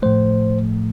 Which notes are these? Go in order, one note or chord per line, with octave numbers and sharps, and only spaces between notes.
A2 F3 A3 C5